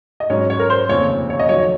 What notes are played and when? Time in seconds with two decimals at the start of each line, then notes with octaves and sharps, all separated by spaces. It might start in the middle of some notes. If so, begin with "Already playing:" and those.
0.20 D#5
0.30 G#2 F#3 C#4 C#5
0.50 C#5
0.59 A#4
0.70 C5
0.89 F1 D#2 C#3 F3 C4 C#5
1.30 C#5
1.39 D#5
1.49 F1 F2 D#3 F#3 C#5